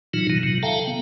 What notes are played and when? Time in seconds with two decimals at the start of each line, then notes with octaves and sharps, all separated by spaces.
0.14 A#2 E3 F#3 D#4 F4
0.30 B2 D#3 F#3
0.43 C3 F#3
0.63 A4 E5 F5 G5 A5 A#5
0.87 B3